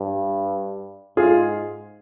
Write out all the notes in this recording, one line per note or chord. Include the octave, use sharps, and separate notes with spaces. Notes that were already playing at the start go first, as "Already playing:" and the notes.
Already playing: G2
G#2 F4 G#4